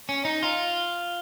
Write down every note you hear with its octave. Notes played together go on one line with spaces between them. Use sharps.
C#4
D#4
F4